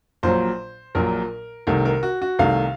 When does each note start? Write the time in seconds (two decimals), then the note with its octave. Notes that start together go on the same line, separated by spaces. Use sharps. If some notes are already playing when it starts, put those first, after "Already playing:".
0.23 A#1 A#2 F#3 C5
0.95 A#1 A#2 F#3 A#4
1.67 C2 C3 D#3 A3 A#4
1.85 A#4
2.03 F#4
2.22 F#4
2.39 C2 C3 D#3 A3 F5